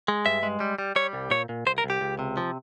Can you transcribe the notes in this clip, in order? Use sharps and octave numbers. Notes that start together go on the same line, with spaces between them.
G#3
G2 E5
G#3
G3
G3
G3 C#5
C2
A#2 C#5
A#2
C2 C5
A#4
C2
G4
C#2
C3
F3